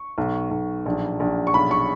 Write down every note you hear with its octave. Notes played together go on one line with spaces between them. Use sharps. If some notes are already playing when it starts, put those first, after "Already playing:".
Already playing: C#6
B1
B1
A#1
A#1
C#6
B1 B5
C#6